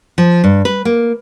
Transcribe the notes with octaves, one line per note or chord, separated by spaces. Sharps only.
F3
G2
B4
A#3